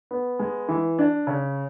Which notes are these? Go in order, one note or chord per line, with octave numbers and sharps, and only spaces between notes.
B3
G#3
E3
D4
C#3